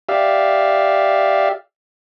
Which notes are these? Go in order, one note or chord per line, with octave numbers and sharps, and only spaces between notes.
G4 D5 E5 F5